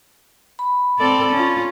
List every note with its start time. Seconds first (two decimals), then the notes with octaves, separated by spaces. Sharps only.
0.59 B5
0.99 C4 A4 D5
1.32 C#4 F4